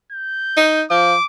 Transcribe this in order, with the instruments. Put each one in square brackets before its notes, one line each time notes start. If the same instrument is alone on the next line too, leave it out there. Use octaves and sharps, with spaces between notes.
[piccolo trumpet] G6
[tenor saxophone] D#4
[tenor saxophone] F3 [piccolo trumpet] D6